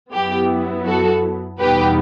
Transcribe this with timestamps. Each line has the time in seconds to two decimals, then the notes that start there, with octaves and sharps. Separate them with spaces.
0.13 F#2 F#3 B3 E4 G4
0.86 F#4 A4
1.59 E2 B2 G3 B3 D#4 G4 B4